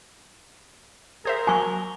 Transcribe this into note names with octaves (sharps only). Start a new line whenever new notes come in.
G#4 A#4 C5 E5
F#3 F#4 G#5 C#6